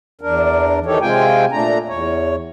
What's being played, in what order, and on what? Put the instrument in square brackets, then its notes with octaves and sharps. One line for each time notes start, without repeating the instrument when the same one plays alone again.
[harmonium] E2 D4 A#4
D#3 E3 D#4 G4 A4 C#5
C3 G#3 C4 F4 G5 G#5
A#2 A3 D4 A#5
E2 C#5